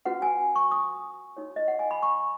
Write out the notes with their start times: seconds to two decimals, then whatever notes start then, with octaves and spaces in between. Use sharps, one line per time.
0.05 C#4 F#4 B4 F#5
0.22 G#5
0.56 C#6
0.71 D#6
1.37 D#4 F#4 C#5
1.56 D#5
1.68 F#5
1.79 G#5
1.91 B5
2.03 C#6